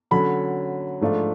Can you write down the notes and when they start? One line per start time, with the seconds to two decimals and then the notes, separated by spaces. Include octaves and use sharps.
0.11 D3 F#3 C#4 B5
1.01 G#2 F3 A3 D4 F4